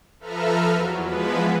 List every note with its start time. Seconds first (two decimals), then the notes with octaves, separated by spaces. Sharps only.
0.20 F3 A4 B4 E5 A#5 F6
0.72 E2 F#3
1.02 E3 F3 G#3 B3 B4